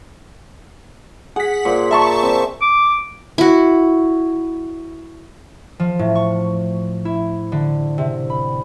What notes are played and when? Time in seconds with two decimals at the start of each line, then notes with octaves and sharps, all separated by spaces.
1.36 G#4 F#5 B6
1.65 A#2 C5
1.91 A#4 E5 A5 C#6
2.23 C4 D5
2.62 D6
3.38 E4 F#4
5.79 F3
5.99 A2
6.15 C#6
7.05 E4
7.52 D3
7.98 C3
8.30 B5